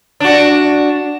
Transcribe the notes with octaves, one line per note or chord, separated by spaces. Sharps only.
D4 F#4